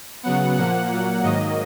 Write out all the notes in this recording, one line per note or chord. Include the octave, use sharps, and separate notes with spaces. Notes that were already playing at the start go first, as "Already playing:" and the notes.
C#3 F#3 B3 F#5
A#2 F3 A#3 F#5
A#2 F#3 A#3
G#2 D#3 F#3 A#3 D#5